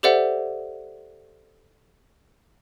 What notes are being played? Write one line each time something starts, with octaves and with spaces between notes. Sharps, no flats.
G4 A4 C5 D5 E5 F#5